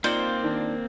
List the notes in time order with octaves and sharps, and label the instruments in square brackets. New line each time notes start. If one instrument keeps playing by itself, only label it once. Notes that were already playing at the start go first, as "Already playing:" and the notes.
[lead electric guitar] A#3 C4 [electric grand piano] D#4 F4 D5 [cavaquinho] C5 [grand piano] C#7 F#7
[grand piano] D#3 D4